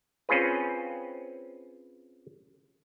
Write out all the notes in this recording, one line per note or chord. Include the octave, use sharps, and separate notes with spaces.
C4 C#4 F4 G#4 B4